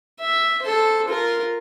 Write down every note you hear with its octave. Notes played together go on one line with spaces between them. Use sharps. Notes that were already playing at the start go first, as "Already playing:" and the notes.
E5
A4 C5
F4 A#4